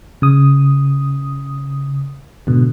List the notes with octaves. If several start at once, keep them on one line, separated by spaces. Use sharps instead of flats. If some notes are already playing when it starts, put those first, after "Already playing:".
C#3 D#6
G#2 B2 D3